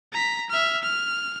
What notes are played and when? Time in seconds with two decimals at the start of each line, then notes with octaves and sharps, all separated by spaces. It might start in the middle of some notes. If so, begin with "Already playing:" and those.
0.13 A#5 B6
0.50 E5 F6
0.83 F6